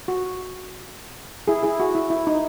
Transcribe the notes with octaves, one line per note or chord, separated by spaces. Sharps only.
F#4
E4 G#4
E4 G#4
F#4
E4
E4
D#4